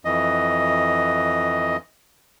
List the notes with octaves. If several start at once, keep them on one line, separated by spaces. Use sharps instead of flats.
F2 E3 D#5